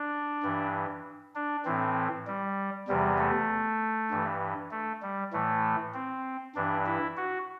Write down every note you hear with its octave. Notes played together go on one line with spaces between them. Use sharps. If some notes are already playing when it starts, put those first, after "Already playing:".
Already playing: D4
G2 E3
D4
A2 E3 C4
G3
E2 C3 E3 G3
A3
G2 E3
A3
G3
A2 E3 A3
C4
G2 E3 D4
E4
F#4